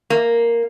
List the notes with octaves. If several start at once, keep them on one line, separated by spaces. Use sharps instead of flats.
A#3